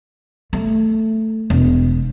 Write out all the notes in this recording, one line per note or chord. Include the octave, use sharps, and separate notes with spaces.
A3
E1